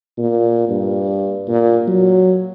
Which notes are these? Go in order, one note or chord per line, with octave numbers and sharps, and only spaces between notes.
A#2
G2
A#2
F#3